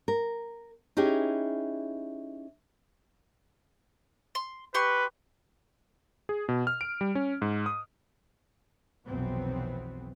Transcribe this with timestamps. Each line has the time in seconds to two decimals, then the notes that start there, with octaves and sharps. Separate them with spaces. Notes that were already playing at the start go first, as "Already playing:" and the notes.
0.08 A#4
0.97 C#4 D#4 E4 G4 G#4
4.35 C6
4.74 G4 B4 C6 C#6
6.29 G#4
6.49 B2
6.67 F6
6.81 D7
7.01 G3
7.15 C#4
7.42 G#2
7.66 D#6
9.06 F1 B1 E3 F#3 B3 C4